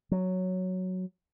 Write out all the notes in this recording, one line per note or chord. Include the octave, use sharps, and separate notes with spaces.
F#3